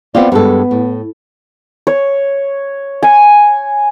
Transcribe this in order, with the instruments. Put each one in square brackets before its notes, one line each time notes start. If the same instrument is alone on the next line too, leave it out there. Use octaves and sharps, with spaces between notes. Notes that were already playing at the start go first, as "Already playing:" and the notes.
[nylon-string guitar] B3 C4 F4 [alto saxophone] D5
[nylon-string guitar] G2 G#3 A4 [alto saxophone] B3
[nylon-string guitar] A2
[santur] C#5
G#5